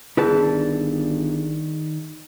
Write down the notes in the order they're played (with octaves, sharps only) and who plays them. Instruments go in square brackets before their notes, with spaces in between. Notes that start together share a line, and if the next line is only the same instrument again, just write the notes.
[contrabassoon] G1 [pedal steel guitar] D#3 D5 G6 [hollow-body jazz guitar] E4 B4 A5 [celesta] G#4